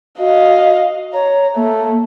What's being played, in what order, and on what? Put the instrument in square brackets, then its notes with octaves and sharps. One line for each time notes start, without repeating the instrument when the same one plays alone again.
[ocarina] F#4 [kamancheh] D#5 F5
[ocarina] C#5 [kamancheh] A#5
[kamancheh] A3 [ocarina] A#3